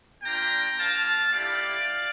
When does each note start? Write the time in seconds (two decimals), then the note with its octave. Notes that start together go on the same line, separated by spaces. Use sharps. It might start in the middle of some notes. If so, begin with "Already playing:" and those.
0.23 A#3 D4 F4 G5 A#5
0.78 A#3 D4 F4 F5 A5
1.33 A3 E4 G4 D5 F5